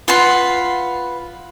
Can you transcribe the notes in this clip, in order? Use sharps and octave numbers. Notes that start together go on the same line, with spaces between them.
F4 B4 F#5 C6